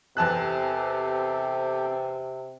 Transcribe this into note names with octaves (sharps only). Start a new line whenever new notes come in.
E2 C3 C4 G4 A4 A5 F#6